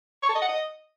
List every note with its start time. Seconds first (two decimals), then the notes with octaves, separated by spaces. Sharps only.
0.23 C#6
0.29 A4
0.35 D#5
0.42 F#5
0.48 D#5